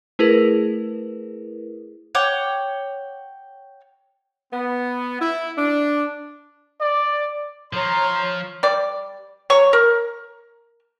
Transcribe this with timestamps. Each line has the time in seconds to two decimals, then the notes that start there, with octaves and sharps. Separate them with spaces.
0.19 A3 E4 G#4 A#4 B4
2.15 C#5 F#5 G5 D6
4.52 B3
5.19 E4
5.57 D4
6.80 D5
7.73 F3 C#5 A#5 C6
8.63 G3 D5
9.50 F#3 C#5 C#6
9.73 A#4